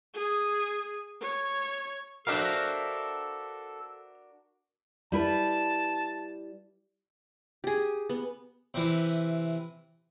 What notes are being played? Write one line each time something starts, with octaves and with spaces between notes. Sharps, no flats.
G#4
C#5
D4 F#4 A4 A#4 C5 E5 F5
G3 E4 B4 A5
G4 G#4
B3
C3 E3